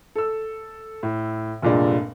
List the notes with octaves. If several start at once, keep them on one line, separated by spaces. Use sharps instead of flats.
A4 E6
A2
F1 G2 A#2 G#3 D4